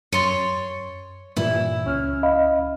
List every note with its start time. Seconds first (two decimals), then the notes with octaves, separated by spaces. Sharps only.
0.13 F#2 C#5 C6 A6
1.37 G2 A#2 E3 E4
1.84 C#2 C#4 F6
2.23 D#5 F5 B5